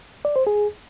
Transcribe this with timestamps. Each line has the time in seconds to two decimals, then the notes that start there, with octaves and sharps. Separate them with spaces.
0.25 D5
0.36 C5
0.47 G#4